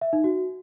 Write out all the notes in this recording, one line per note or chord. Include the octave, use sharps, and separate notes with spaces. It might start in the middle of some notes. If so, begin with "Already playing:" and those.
E5
D#4
F#4